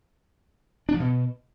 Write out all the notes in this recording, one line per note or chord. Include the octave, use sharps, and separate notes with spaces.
D4
F3
B2